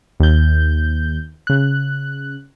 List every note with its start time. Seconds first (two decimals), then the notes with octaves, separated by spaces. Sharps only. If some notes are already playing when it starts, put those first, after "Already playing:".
0.20 D#2 G6
1.47 C#3 F#6